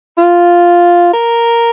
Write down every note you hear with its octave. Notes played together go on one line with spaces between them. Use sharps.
F4
A#4